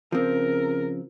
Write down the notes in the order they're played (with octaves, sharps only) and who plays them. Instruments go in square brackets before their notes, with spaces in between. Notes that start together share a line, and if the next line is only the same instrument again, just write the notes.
[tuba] C#3 [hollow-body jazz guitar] F3 C4 [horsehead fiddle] A#4